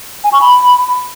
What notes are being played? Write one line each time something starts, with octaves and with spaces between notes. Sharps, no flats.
G#5
C#6
B5